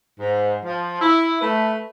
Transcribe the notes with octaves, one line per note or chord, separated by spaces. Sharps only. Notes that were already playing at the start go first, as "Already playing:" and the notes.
G#2
F3
E4
A3 B4